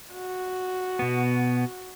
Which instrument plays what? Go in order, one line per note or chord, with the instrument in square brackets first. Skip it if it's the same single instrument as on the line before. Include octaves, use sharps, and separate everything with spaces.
[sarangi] F#4
[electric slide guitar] B2 B3